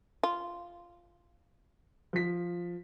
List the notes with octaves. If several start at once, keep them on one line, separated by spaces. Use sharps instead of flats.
F4
F3 B6